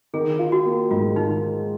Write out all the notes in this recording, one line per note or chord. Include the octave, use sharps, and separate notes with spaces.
D#3 G#4
F4
F#4
A#3
G#2 F4
D#3 D#4